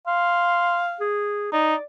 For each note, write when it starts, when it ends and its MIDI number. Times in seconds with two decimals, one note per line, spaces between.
0.07 1.03 77
0.07 0.81 84
1.00 1.49 68
1.53 1.75 63
1.53 1.84 74